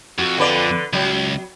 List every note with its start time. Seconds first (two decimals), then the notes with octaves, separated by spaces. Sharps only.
0.19 F2 F#4
0.38 D3 B4 D5
0.93 C#2 F#3